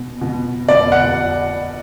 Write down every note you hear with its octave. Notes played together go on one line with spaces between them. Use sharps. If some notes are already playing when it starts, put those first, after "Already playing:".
Already playing: B2
B2
B2 D5
F#5